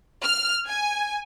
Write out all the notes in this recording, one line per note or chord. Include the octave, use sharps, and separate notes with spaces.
F6
G#5